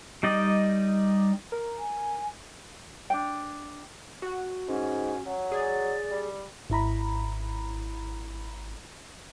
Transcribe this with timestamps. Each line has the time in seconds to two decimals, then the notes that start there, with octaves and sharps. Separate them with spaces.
0.23 G3 D#4 D5 D#5
1.52 A#4
1.79 G#5
3.10 D4 G5
4.22 F#4
4.68 G#2 C#4
5.27 F#3
5.52 G#4 D5
6.11 G3
6.70 G#1 E4 A#5 B5